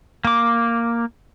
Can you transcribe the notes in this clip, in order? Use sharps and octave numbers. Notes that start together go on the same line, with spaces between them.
A#3 D6